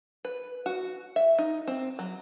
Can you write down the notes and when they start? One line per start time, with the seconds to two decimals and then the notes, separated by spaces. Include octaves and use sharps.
0.25 B4
0.66 F#4
1.16 E5
1.38 D#4
1.67 C4
1.99 F#3